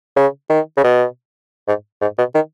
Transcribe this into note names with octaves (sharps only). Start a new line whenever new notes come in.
C#3
D#3
C#3
B2
G#2
G#2
B2
D#3